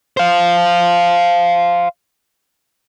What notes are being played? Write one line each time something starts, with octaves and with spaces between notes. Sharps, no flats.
C5 F5